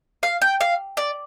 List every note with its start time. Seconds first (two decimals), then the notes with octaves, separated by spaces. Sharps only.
0.23 F5
0.42 G5
0.61 F5
0.97 D5